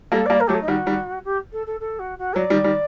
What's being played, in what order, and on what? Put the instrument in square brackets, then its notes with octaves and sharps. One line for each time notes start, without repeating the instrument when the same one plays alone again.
[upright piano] G3 A#3 [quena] A4
[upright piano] G3 A#3 [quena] D5
[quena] A#4
[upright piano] F#3 A3 [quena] G4
[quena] A4
D#4
[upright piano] D#3 G3 [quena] F#4
[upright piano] D#3 G3
[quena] G4
A4
A4
A4
F#4
F#4
[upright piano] F#3 [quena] D5
[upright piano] D#3 G3
D#3 G3